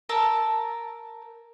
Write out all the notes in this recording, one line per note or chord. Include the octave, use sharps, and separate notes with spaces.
A#4 A5 E6